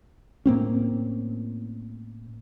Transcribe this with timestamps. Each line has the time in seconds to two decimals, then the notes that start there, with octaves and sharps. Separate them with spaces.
0.46 A2 A#3 C4 C#4